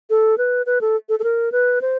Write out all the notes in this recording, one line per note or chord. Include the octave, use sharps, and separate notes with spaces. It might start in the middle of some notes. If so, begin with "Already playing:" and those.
A4
B4
B4
A4
A4
A4
A#4
B4
C5